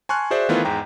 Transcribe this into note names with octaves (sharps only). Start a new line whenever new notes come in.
G#5 A5 C6 C#6 F6 F#6
F#4 G#4 C5 D5 E5
D#3 E3 A3 B3 E4 F4
E2 G#2 G5 A#5